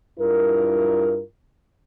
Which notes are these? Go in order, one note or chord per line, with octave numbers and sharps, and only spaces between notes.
G2 E4 F4 A#4